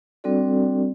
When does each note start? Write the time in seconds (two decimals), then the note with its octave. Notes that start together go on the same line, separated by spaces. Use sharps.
0.24 G3 C4 D4 F#4 A4 D5